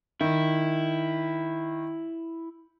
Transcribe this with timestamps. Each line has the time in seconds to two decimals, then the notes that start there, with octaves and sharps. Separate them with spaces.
0.21 D#3 E4